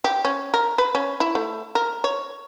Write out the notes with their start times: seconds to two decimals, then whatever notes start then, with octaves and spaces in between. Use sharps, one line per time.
0.04 G4
0.25 C#4
0.54 A#4
0.78 B4
0.95 C#4
1.20 E4
1.35 A3
1.75 A#4
2.04 C#5